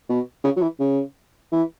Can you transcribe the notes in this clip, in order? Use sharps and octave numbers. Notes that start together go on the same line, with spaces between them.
B2
C#3
F#3
E3
C#3
E3